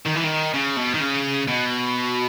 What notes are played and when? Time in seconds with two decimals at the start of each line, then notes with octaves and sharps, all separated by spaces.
0.06 D#3
0.16 E3
0.24 D#3
0.54 C#3
0.76 B2
0.94 D#3
1.00 C#3
1.48 B2